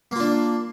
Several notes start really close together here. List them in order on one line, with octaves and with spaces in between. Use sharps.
A#3 F4 D4